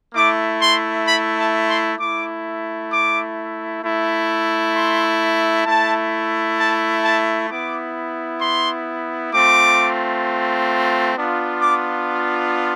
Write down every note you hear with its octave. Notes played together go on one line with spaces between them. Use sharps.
A3 E4 D6
C6
B5
A5
C6
A3 E4 D6
D6
A3 E4
C6
A3 E4 A5
A5
A5
B3 E4 D6
C6
A3 C4 F4 D6
B3 D4 F4
D6